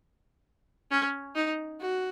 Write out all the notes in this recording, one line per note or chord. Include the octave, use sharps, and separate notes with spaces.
C#4
D#4
F#4